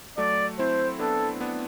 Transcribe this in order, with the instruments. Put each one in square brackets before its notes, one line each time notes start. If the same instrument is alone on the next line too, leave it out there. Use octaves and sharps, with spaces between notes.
[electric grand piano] F#3 A3 [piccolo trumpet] D5
[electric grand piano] C4 E4 [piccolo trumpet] C5
[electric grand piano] B3 D4 [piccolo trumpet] A4
[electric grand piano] B3 D4